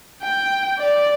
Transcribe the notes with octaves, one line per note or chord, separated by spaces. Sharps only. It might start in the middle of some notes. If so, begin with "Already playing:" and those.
G5
D5